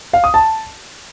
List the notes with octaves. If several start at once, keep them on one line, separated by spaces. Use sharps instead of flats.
F5
D#6
A5